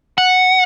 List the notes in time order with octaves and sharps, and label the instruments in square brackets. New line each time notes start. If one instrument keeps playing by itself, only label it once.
[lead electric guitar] F#5